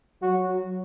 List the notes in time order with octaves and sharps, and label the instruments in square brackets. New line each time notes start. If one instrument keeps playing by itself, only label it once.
[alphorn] F#3 [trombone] F#4